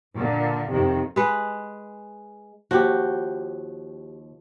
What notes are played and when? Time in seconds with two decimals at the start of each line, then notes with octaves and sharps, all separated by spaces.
0.16 A#2 D3
0.70 F2 C3 D#3
1.16 G#3 B4
2.71 D#2 F3 F#4 G4 D5